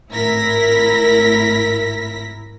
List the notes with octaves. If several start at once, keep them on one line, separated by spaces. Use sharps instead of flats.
G#1 A2 E4 A#4 A#6 B6